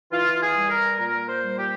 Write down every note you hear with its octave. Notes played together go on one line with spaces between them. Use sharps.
E3 F4
G#4
G3
A#4
A#2 A#4
C5
G3
G4